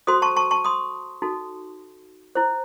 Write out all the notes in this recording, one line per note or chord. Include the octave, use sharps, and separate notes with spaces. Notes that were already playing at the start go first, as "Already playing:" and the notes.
F#4 A4 C5 C6 D#6
A5 C#6
A5 C#6
A5 C#6
C6 D#6
D#4 F#4 A4
E4 C5